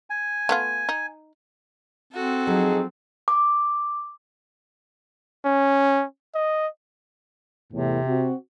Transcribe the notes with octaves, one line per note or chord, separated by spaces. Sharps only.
G#5
A3 B3 F4
D#4
C4 F#4 A4
F3 F#3 D#4 G#4
D6
C#4
D#5
E2 A2 C3
C4 F#4